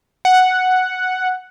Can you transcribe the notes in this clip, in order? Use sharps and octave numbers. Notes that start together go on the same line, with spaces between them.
F#5